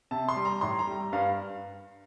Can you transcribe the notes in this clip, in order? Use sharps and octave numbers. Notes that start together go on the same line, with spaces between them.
C3 A5
C6
G3
A#5
A2 C6
A#5
G3
G2 F5